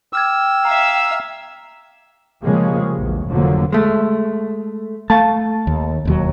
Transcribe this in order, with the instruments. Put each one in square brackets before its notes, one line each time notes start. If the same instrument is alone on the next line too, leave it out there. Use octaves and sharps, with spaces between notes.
[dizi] G5 [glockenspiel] D6 F6 G#6 [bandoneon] E6
[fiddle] E5 F5 [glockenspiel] A#5
[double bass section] C#3 F3 G3 G#3 A#3 C#4
A#1 E2
F1 F2 D3 F3 F#3 A#3
[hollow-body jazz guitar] G#3 A3
[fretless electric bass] A3 [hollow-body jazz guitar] F5 A5
[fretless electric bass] D#2
E1 D#2 F#3